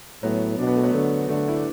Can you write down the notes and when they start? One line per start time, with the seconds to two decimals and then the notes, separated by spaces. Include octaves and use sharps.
0.23 A2 F#3 B3
0.59 B2 D4
0.67 B3
0.75 A3
0.83 F#3 B3
0.93 D3 A3
1.29 D3 A3
1.48 E4
1.56 D4